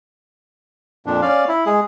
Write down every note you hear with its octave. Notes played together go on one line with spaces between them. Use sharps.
F2 A#2 F3 D4
C#4 D5 F5
E4
G#3 G#4